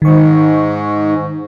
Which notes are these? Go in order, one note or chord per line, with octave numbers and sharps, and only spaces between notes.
G#2 D#3 C#6